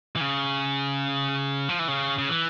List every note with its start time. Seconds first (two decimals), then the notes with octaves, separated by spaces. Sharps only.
0.16 E3
0.21 C#3
1.69 F3
1.79 E3
1.88 C#3
2.18 C#3
2.29 E3